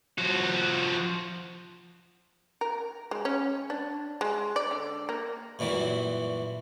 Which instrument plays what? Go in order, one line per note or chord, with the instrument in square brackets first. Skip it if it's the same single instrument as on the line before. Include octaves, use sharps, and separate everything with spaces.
[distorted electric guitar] F3 F#4
[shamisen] A#4
G#3
C#4
D4
G#3
D5
D3
A#3
[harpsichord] F#2 A#2 E3 F#3 G3